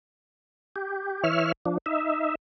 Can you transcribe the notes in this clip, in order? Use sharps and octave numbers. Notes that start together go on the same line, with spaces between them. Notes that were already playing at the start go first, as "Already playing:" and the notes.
G4
E3 C#5 E5 F6
F3 D4
D#4 E5